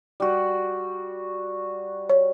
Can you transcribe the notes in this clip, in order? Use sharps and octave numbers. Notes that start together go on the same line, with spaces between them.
G3 F#4
C#5